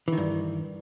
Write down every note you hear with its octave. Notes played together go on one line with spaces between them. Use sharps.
G2 D#3 E3